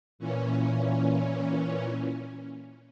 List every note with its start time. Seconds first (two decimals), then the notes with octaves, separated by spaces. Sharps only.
0.19 A#2 E3 C#4